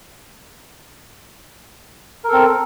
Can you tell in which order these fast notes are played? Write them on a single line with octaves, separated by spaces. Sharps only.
A#4 A4 C4